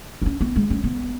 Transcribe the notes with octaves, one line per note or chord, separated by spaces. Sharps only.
D#4
C#4
B3
G#3
C#4
B3